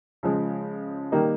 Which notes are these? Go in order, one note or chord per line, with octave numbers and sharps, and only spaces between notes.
C#3 F3 G#3
D#3 G3 A#3 D#4